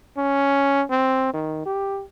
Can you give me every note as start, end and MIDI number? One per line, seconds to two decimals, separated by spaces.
0.17 0.82 61
0.90 1.32 60
1.34 1.65 51
1.66 2.03 67